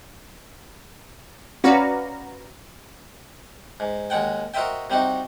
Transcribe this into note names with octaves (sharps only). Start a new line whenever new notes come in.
C#4 F#4 B4 D5 F5 A#5
G#2
D#2 G#3 F#5 G5
F#4 A#4 C5 D#5 E5 G5
C3 G3 C4 D#4 F#4